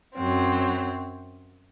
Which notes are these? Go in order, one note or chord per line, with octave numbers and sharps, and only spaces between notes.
F#2 F#3 C4